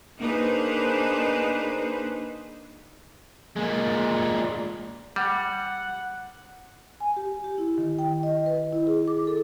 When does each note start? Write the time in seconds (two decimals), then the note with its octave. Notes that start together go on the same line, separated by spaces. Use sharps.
0.19 A#3 D4 D#4 G#4 B4 C5
3.56 A#2 G#3
5.16 G3 F#5
7.00 G#5
7.17 G4
7.44 G4
7.58 E4
7.78 D#3
7.99 G5
8.23 D#5
8.46 B4
8.72 E4
8.87 G#4
9.08 D6
9.27 A4